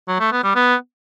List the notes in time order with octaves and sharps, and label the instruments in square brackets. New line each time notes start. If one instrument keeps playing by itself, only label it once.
[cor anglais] F#3
A3
B3
G3
B3